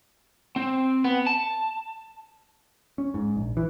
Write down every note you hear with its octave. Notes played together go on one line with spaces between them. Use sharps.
C4
B3
A5
C#4
G#2
A#1
E3